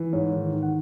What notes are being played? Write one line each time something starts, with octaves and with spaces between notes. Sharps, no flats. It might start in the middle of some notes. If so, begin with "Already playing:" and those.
Already playing: E3
G#2 C#5
D#3
D#3
F#5